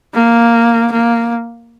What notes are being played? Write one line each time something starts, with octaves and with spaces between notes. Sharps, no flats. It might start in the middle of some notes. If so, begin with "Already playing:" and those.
A#3
A#3